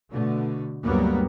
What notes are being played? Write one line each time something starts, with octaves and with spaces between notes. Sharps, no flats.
B2 D3 A3
D2 G2 F#3 G3 A#3 B3